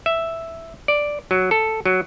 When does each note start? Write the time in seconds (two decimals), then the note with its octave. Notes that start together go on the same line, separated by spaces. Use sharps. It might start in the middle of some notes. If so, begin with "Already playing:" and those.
0.06 E5
0.88 D5
1.31 F#3
1.51 A4
1.85 F#3